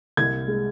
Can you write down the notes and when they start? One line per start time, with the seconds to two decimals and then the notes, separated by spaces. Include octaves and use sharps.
0.17 C2 G#6
0.48 G#3